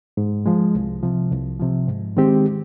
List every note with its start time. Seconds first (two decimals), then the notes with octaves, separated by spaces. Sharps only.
0.17 G#2
0.46 F3 G#3
0.75 C2
1.03 C3 F3
1.32 C2
1.59 C3 F3
1.87 G#2
2.17 D#3 G#3 C4 G4